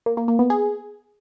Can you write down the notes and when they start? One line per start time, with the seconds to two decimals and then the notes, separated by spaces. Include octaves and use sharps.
0.06 A#3
0.17 A#3
0.28 A#3
0.39 B3
0.50 G#4